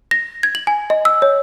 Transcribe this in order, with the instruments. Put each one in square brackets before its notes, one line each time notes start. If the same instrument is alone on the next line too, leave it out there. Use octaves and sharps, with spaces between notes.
[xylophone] A#6
G#6
F#7
G#5
D#5
E6
C#5